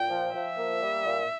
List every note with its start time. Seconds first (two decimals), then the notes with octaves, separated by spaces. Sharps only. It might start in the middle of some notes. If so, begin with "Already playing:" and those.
Already playing: A#2 G5
0.10 F3
0.34 F3 E5
0.58 A#3
0.82 G3
1.05 A#2